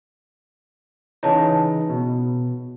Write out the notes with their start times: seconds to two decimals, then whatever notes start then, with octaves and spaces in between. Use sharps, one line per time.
1.23 C#3 E3 D#4 C#5 A5
1.90 B2